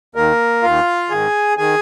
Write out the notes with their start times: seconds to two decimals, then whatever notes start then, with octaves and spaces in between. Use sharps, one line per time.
0.15 D#2 D#3 A#3 A#4
0.63 D#2 D#3 F4 F5
1.10 G#2 D#3 G#4 G#5
1.57 D#3 G#4 G#5